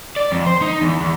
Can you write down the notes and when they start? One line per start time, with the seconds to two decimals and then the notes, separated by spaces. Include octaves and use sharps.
0.16 D5
0.32 F2
0.47 C5
0.62 D#4
0.81 E2
1.00 E2